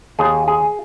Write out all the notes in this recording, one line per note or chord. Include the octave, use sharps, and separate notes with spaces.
D#2 G#4
G#4